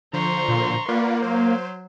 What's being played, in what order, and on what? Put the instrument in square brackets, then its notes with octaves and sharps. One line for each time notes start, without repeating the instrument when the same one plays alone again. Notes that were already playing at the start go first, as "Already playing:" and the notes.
[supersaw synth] D3 F3 C5 [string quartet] A#5 C6 C#6
[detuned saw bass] A#2
[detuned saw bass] A#3 [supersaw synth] F4 D5 F#5 [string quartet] B4
[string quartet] F#3 [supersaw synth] C5